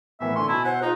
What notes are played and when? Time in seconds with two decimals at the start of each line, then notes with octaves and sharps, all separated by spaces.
0.20 A2 E3 B3 A#4 E5
0.36 D3 G#5 C6 C#6
0.48 B2 E4 A5
0.65 C5 F#5
0.82 D#4 F4 G#4